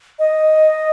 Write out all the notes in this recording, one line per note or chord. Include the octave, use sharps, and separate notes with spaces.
D#5